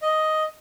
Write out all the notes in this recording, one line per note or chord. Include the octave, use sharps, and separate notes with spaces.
D#5